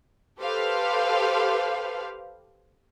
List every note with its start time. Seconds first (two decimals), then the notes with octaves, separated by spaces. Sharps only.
0.40 G4 A4 B4 C5 F5